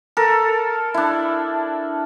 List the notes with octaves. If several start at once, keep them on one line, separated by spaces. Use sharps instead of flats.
A4 A#4
D4 E4